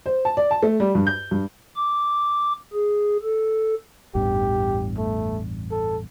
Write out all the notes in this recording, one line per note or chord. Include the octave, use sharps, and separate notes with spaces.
C5
A5
D5
A5
A3
G3
G2
G6
G2
D6
G#4
A4
A1 E2 G2 G4
A3
A4